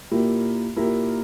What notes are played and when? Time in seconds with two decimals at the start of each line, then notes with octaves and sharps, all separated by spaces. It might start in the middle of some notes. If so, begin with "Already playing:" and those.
0.11 A#2 A#3 E4 G4 A#4
0.76 A#2 A#3 E4 G4 A#4